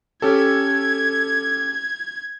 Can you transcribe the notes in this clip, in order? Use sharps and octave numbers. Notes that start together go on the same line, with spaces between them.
C#4 G4 A4 G#6